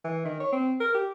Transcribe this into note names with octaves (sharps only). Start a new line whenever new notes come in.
E3
D#3
C#5
C4
A#4
G4